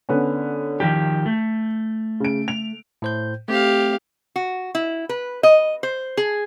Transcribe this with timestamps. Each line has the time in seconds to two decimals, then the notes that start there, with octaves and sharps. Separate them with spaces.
0.09 D3 B3 C#4
0.80 D#3 F3 G4 G6
1.26 A3
2.20 C#3 D7
2.48 F7
3.02 A2 C5 G6
3.48 A3 C4 G4 F5
4.36 F#4
4.75 E4
5.09 B4
5.43 D#5
5.83 C5
6.17 G#4